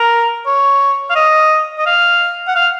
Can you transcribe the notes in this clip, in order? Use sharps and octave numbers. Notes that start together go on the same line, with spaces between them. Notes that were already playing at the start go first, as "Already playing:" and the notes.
Already playing: A#4
C#5
F5
D#5
D#5
F5
F#5
F5